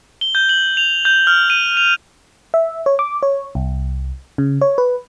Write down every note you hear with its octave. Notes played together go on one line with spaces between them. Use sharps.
G7
G6
F#7
F7
G6
F6
D#7
F7
E5
C#5
D6
C#5
C2
C#3
C#5
B4